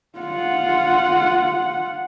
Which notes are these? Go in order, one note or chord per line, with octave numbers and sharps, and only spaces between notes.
F4 F#5